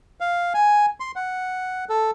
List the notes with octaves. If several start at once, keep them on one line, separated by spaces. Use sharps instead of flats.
F5
G#5
C6
F#5
A4